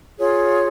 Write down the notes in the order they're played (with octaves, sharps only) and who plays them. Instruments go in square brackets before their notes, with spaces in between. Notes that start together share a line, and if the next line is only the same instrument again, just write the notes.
[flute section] F4 G#4 C#5